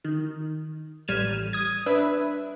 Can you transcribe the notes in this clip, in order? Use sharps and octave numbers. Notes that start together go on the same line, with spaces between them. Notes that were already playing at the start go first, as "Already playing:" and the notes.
D#3
A1 G3 F6 G#6 D#7 E7
D#6 G#6
D4 B4 E5